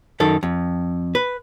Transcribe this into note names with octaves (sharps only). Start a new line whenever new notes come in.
F#2 D#3 A4
F2
B4